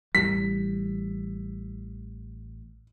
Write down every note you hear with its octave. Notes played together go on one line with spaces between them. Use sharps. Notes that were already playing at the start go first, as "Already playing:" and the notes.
A1 E3 G3 B6